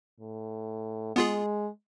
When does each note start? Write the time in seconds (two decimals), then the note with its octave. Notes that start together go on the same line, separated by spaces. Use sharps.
0.20 A2
1.16 G#3 B3 F4 G#4